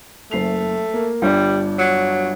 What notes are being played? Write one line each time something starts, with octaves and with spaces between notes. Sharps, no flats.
F#1 A3 C7 F7
A#3
G1 G3 D4
F#3